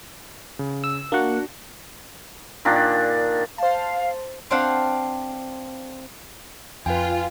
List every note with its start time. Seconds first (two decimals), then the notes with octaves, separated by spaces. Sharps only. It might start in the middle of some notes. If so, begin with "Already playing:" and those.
0.59 C#3
0.84 E6
1.12 A#3 D4 F#4 F#5
2.65 A#2 D#3 D4
3.58 C5 F5 A5
4.50 C4 D4 F4 C5 F5 F#5
6.86 F2 F4 B4 G5 G#5